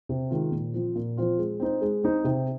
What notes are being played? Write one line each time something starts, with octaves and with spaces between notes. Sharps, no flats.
C3
D#3 G#3 F4
A#2
F3 C4 F4
A#2
F3 C4 F4
G#3
C4 D#4 C5
G#3
C4 D#4 C5
C3